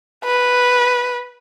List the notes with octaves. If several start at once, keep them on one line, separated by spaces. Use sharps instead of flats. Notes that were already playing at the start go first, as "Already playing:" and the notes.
B4